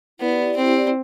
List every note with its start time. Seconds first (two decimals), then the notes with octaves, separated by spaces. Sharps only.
0.20 B3 E4 G4 D5
0.57 C4